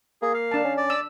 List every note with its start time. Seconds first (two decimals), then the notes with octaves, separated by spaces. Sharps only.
0.22 A#3 G#4
0.34 F5
0.51 D4 A5
0.64 C#4
0.77 D5
0.90 E6